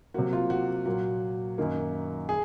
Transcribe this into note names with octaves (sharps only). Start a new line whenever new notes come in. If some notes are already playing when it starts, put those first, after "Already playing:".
C3 F#3 A#3 F#4
F4
F#4
A#2 F#3 A#3 F#4
F#2 D#3 A#3
G#4